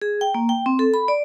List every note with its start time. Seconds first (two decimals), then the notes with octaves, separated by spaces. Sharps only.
0.02 G#4
0.21 G5
0.34 A#3
0.49 G5
0.66 C4
0.79 A4
0.94 B5
1.08 D5